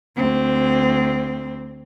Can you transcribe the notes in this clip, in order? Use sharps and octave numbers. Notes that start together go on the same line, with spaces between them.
D2 C4